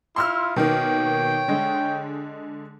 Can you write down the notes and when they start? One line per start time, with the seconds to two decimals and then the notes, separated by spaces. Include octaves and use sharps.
0.16 E4 F4 C6 E6 F6
0.56 B2 D#3 A#3 C#5 G5
1.48 D3 G#3